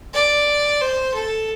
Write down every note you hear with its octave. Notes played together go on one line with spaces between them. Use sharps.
D5
C5
A4